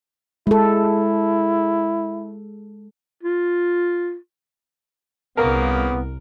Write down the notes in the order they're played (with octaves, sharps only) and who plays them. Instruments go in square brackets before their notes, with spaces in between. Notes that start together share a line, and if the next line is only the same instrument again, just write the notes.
[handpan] G#3 A4 [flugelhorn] E4
[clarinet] F4
[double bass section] C2 [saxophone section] C#3 A#3 [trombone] B3 [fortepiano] A#4